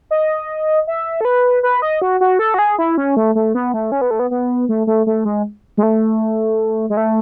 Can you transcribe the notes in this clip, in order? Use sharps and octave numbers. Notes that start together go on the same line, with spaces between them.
D#5
E5
A4
B4
B4
D#5
F#4
F#4
A4
F#4
G#4
E4
C#4
A3
A3
B3
A3
C#4
B3
A3
B3
B3
A3
A3
A3
G#3
G#3
A3
G#3
A3